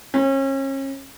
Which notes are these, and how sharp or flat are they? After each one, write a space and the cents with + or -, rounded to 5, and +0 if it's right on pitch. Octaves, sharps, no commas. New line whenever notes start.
C#4 -35